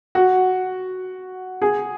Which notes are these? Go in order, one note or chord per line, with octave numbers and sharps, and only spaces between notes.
F#4
G#4